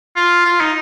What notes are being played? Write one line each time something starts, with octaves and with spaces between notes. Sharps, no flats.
F4
F4
D#4